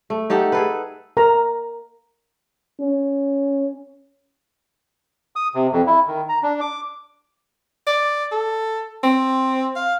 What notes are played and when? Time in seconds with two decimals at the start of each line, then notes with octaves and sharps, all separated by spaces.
0.10 A3
0.30 D#4 G4 A4 F#5
0.52 G#4 A4 B4
1.17 A#4 A#5
2.80 C#4
5.36 D#6
5.55 C3
5.72 F2
5.87 E4
6.07 D#3
6.29 A#5
6.43 D4
6.61 D6
7.87 D5
8.32 A4
9.03 C4
9.76 F5